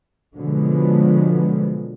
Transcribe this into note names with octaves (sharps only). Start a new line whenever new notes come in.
B2 D3 F3 F#3 G#3 B3